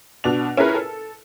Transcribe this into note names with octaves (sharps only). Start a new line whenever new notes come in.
B2 D4 F7
C#4 E4 G#4 A#4 B4
A4